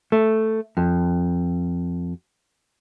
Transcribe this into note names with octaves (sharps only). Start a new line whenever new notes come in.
A3
F2